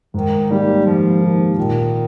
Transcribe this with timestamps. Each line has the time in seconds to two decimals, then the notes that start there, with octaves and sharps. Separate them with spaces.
0.14 G#2 D#3
0.50 D#3 G3 A#3 D#4 G4
0.86 G#2 F3
1.22 D#3 A#3 D#4 G4
1.57 A#2 D#3